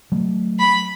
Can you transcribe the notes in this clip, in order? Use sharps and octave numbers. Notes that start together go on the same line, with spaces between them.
F#3 A3
B5